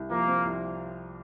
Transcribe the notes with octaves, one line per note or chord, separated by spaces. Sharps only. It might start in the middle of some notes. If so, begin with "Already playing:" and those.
Already playing: C2
F3 A#3
C4
C2